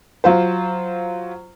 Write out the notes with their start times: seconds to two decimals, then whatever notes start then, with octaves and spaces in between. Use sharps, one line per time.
0.24 F#3 F4 C5